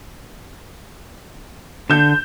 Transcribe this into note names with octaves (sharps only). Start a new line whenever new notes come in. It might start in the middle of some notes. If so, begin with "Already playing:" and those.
D3 G6 E7